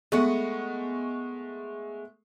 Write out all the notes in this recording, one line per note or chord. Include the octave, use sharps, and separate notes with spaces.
G#3 A3 B3 D#5 F#5 C#6